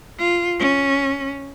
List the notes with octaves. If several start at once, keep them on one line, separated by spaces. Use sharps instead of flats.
F4
C#4